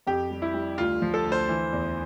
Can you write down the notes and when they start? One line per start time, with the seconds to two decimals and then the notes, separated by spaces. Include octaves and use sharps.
0.07 F2 G4
0.31 G3
0.42 E4
0.54 G3
0.78 D2 F4
1.02 F3
1.14 A4
1.25 D2
1.32 C5
1.49 E3
1.73 E2